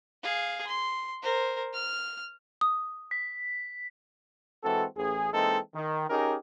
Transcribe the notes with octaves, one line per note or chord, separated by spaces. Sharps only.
G#4 F5
C6
A#4 C5
F6
D#6
B6
E3 G#3 C4 F#4 A4
A1 G#4
E3 G#3 A#3 C4 D#4 A4
D#3
C#4 D#4 G4 G#4 A#4